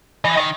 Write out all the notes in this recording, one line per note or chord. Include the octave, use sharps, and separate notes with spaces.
E3 D#5
D#3